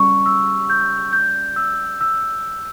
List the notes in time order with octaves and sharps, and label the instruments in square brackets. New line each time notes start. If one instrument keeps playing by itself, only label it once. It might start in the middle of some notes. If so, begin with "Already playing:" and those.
Already playing: [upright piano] C#3 G3 [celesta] C#6
[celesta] E6
G6
G6
E6
E6